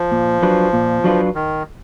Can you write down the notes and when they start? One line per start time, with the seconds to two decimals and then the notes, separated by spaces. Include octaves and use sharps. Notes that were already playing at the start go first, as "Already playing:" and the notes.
Already playing: F3
0.12 A#2
0.42 F#3 D4 F4 B4
0.73 A#2
1.04 F#3 D4 F4 B4
1.35 D#3